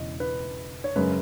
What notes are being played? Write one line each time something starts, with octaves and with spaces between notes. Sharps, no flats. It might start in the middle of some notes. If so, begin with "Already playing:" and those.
Already playing: E1 E2 C#3 D#5
B4
C#5
F#2 C#3 G#3 B4